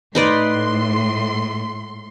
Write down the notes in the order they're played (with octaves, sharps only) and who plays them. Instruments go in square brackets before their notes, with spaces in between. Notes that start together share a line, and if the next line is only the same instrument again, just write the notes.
[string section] A2 C6 [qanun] D#4 B4 D5